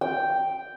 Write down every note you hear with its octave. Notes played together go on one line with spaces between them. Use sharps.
G5